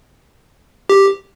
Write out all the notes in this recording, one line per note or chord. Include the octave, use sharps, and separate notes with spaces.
G4